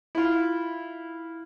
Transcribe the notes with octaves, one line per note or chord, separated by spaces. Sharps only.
E4 F4